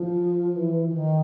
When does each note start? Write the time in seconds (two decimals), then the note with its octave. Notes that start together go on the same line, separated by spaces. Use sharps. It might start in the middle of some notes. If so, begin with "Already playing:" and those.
Already playing: F3
0.56 E3
0.89 E3
0.94 D#3